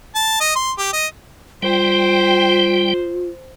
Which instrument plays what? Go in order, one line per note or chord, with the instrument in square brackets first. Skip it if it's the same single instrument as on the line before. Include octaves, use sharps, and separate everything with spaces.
[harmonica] A5
D#5
C6
G4
D#5
[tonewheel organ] G3 G5 [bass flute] F4 [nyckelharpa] C5